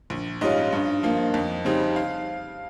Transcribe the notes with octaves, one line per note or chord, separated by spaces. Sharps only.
A#1
G#2 G3 C#4 F4 D#5
G2
F3 A#3 F4
F2
C#3 G3 C4 D#4
F5